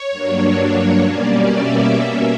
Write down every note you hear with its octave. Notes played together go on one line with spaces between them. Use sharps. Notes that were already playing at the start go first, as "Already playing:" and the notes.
Already playing: C#5
G2 F#3 A#3 D4
B2 G3 A#3 C#4 D5
E5
B2 A#3 C#4